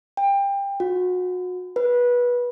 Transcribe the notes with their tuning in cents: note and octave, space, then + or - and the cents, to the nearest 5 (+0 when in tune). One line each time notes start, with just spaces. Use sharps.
G5 +25
F#4 -30
B4 -20